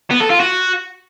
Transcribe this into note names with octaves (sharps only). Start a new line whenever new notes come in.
B3
A4
F4
F#4